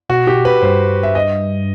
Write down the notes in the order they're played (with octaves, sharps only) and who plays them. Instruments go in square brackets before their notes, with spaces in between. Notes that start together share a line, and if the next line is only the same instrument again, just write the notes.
[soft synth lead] B2 [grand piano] F#4
[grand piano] G4
B4
[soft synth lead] G2 [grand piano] C5
[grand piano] E5
D#5